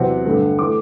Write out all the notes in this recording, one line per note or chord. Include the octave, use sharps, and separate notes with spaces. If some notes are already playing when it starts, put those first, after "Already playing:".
Already playing: E2 C3 F#3 C4 F#5
G2 D3 A3
E3 A3 D6